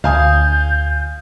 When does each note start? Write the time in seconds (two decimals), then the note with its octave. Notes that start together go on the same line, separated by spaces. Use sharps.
0.04 D2 F5 G#5 D#6 G6